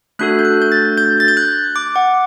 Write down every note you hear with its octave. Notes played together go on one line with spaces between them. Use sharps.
A3 D4 F#4 A4 F#6
G6
F#6
G6
A6
G6
A6
G6
F#6
D6
F#5